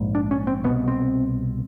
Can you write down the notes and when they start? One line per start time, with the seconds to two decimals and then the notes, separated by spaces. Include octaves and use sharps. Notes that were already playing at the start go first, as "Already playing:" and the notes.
Already playing: A#1 G#2
0.15 D4
0.31 C#4
0.47 C4
0.64 C2 B2 B3
0.88 C4